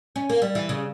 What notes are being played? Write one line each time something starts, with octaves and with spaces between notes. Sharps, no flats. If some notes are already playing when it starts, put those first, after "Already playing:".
C#4
A#3
G3
E3
C#3